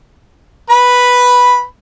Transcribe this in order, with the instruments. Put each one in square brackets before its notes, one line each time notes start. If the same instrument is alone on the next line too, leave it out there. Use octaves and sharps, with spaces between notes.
[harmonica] B4 B5